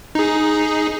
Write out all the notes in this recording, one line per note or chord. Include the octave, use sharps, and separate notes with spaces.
D#4 G#4